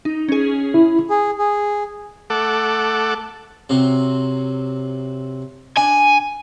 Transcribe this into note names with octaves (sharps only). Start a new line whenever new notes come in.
D#4
C#4 G#4
E4
G#4
G#4
A3 A4 F#5 D6
C3 F#3 C4
D4 G#5